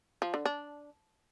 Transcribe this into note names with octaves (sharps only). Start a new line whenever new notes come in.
F3
D3
D4